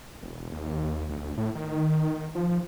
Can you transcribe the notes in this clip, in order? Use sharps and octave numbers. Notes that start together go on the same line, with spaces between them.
E1
D#2
D2
A2
D#3
F3